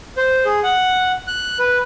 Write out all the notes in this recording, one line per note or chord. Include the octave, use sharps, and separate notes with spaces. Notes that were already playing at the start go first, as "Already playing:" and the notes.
C5
G#4
F#5
F#6
B4